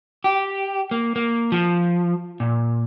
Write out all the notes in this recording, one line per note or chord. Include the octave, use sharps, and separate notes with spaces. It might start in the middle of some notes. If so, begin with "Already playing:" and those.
G4
A#3
A#3
F3
A#2